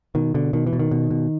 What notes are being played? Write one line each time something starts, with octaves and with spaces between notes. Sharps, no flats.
B2 D#3
B2 D3
B2 D#3
E3
B2
D#3
B2
B2